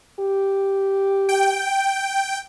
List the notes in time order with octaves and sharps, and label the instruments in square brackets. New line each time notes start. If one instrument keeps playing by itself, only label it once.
[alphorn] G4
[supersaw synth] G5